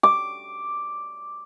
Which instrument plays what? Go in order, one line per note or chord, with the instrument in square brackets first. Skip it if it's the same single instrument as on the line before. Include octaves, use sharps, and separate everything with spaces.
[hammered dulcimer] D6